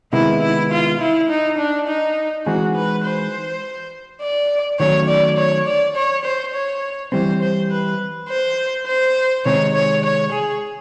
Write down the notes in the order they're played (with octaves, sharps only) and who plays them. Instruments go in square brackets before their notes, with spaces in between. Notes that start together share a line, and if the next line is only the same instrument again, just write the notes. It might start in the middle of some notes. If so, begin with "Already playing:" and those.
[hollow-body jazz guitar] C3 D#3 G#3 B3 [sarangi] E4
[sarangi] E4
F4
E4
D#4
D4
D#4
[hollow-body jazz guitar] E3 G#3 C4 D#4 G#4 [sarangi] F#4
[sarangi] B4
C5
D5
[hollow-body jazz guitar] D#3 F#3 A3 C#4 [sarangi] C#5
[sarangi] D5
C#5
D5
C#5
C5
C#5
[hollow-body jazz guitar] E3 G3 C4 [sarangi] C5
[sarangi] C5
B4
C5
C5
[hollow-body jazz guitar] C3 D#3 G#3 C4 D#4 [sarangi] C#5
[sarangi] C#5
C#5
G#4